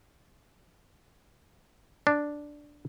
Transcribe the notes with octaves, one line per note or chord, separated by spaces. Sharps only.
D4